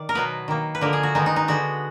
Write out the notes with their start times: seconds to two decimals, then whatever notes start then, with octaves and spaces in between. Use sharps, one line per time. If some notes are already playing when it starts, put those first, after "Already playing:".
Already playing: D#3 D5
0.09 A#4
0.15 B2 F#3 B3 B4
0.48 D#3 A#3
0.75 B4
0.81 D3 F3 A#3 A#4
0.93 G#4
1.03 F#4
1.15 D#3 G#3 B3 D#4
1.26 D#4
1.36 D#4
1.48 D3 G#3 B3 F#4